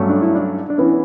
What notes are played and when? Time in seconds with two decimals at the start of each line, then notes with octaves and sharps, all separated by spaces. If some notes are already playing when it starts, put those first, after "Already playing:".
Already playing: G2 F#3 A3 C#4
0.10 D4
0.22 E4
0.35 D4
0.70 D4
0.78 E3 B3 C#4 E4